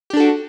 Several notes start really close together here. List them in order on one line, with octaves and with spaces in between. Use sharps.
G4 D4 A4 F#4